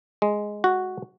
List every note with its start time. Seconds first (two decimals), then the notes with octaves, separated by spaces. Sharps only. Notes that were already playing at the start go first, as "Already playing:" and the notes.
0.22 G#3
0.64 F#4